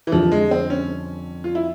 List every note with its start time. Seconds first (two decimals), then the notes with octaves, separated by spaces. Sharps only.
0.07 E3
0.12 F2 D3 F3 G3
0.32 G#3
0.51 C4
0.70 C#4
1.44 F4
1.55 E4